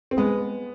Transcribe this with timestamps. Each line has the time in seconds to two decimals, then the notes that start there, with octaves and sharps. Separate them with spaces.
0.11 C4
0.17 G#3 B3